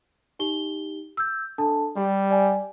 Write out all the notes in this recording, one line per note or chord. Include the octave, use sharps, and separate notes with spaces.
D#4 G4 G7
E6 G6
D4 A4 A5
G3 G4
D5 G#5